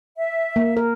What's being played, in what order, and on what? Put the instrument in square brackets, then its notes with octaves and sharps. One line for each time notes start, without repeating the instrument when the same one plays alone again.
[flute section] E5
[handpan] A#3
A#4